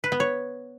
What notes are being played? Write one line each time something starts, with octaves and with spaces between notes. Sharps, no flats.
B4
B3
C#5